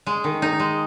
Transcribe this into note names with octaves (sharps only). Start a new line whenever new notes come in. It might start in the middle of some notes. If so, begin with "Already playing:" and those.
G#3
D#3
D#4
G#3